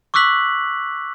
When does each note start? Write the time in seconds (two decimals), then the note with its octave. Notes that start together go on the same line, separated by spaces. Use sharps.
0.14 C#6 D6 E6 F#6 B6 F#7